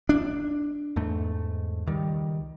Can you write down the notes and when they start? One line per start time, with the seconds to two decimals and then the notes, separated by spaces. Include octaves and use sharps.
0.09 D4
0.96 E2 G#2 A3
1.86 C#2 D#3 G3